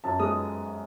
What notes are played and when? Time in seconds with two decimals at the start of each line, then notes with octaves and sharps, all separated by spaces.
0.04 F#2 A5
0.19 G#3 D#6